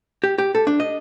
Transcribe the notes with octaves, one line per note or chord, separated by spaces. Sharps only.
G4
G4
A4
D4
D#5